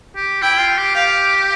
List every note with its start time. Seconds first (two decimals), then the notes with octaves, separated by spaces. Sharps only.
0.16 G4
0.42 E4 G5
0.60 F4
0.78 G4
0.95 G4 F5